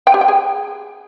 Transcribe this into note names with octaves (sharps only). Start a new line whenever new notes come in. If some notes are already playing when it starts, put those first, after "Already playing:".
G5
G4
G5
G#4